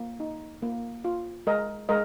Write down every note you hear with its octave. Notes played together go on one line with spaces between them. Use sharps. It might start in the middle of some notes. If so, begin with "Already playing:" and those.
Already playing: A#3
D#4
A#3
F4
G#3 A#4 D#5
G#3 A#4 D#5